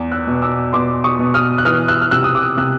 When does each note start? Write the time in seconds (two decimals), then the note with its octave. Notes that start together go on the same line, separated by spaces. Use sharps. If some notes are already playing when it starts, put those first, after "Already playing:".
Already playing: E2
0.12 E6 F#6
0.27 B2
0.42 D6 E6
0.73 B2 C6 D6
1.04 C#6 D#6
1.19 B2
1.34 D#6 F6
1.58 F#6
1.65 E3 D#6 F6
1.88 E6 F#6
2.01 F6
2.11 C3 E6 F#6
2.24 D#6
2.35 D6 E6
2.57 C3 E6 F#6